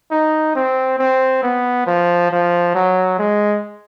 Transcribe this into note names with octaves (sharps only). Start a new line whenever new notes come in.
D#4
C4
C4
B3
F3
F3
F#3
G#3